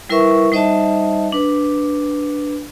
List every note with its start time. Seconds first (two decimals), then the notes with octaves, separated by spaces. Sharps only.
0.09 G3 E4 A#4 B4 E5 C#6
0.52 G3 D#4 C5 D#5 E5 A5
1.32 D4 B4